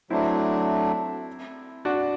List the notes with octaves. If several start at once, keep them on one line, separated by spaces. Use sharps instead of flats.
F#3 A3 C4 D4 E4
D4 F#4